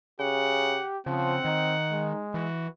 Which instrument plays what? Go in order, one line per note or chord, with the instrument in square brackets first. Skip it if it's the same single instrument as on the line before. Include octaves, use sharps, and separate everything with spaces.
[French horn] C#3 [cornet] G4 [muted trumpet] F#5
[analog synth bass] C#3 [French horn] F3 [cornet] C4 [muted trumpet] F#5
[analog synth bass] D#3 [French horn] D#4
[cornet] G#3
[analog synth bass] E3 [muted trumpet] F#4